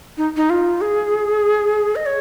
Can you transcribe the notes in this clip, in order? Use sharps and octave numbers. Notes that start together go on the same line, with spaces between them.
D#4
D#4
F4
G#4
D#5
C#5